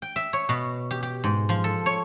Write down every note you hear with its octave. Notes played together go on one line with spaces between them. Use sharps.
G5
E5
C#5
B2
G4
G4
G#2
F3
A4
C#5